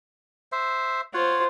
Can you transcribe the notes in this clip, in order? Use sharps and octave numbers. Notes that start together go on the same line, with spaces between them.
C5 E5
F4 C5 C#5 F#5